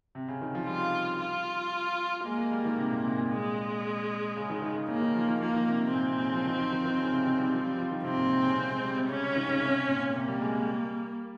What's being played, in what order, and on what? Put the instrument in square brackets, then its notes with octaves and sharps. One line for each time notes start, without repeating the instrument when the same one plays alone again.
[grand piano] C3
C#3
D#3
F3
[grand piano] G3 [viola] F4
[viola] F4
[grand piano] G#3 [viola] A#3
[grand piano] G#3
G3
D#3
C3
A#2
C3
A#2
[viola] G#3
[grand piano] C#3
D#3
D#3
C#3
[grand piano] C#3 [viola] A#3
[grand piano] D#3
F3
D#3
[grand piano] F3 [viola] A#3
[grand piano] D#3
C3
C3
[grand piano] A#2 [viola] C4
[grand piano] C3
C#3
F3
D#3
F3
D#3
D#3
C#3
C3
D#3
G3
F3
G3
F3
D#3
[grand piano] C3 [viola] C4
[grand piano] A#2
C3
C#3
C3
G#3
G3
C3
[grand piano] C#3 [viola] C#4
[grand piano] C#3
D#3
C#3
C3
A#2
[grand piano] C3 [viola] A#3
[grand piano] G3
G#3
G3